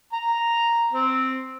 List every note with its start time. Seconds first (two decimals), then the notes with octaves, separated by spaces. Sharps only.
0.13 A#5
0.91 C4